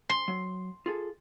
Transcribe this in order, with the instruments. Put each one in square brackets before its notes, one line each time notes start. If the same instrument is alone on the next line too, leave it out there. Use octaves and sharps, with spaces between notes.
[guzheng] C6
[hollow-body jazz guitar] F#3
F4 G#4 A4